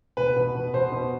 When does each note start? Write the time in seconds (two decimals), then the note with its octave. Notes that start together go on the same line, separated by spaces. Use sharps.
0.17 B2 B4
0.36 B2
0.55 B2
0.73 B2 C5
0.92 B2